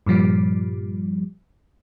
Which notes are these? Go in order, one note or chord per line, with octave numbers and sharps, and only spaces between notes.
G2 A#2 F3 G3